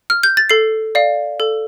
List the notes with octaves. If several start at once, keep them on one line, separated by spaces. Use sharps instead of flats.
F6
G6
A6
A4 C7
D5 F5
A4